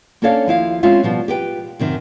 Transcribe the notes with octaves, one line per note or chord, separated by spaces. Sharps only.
A#3 C#4 D4 A4 C#5 F5
D#2 F3 E4 F5
G#3 C4 C#4 F4 C5 E5
B2 F3 G3
G4 B4 G5
F#2 C3 D#3